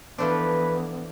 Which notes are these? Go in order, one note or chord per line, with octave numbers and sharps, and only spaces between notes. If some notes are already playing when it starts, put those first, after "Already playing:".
E3 F3 A3 B3 D4 B4